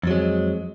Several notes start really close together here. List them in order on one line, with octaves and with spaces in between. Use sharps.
F2 F#3 G#3